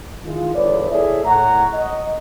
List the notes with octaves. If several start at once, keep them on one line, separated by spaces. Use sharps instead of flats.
D#3 G#3 E4 F4
G1 E2 B4 C#5 D5
E4 G#4 A4 C#5 E5
A2 C#5 F#5 A#5
D#5